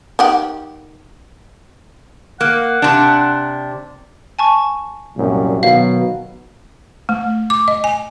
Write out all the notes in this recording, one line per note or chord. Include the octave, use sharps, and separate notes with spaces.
D#3 G4 F#5
A#3 F#5
C3 D4
G#5 A5 C#6
C2 F#2 A#2
B2 D#3 F#3 F5
A3
D6
D#5
G#5